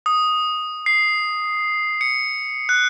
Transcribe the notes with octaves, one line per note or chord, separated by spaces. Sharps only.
D#6
C7
C#7
F#6